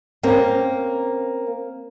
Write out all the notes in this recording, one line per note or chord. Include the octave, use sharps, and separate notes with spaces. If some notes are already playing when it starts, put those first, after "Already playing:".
A#3 C4 C#4 A#4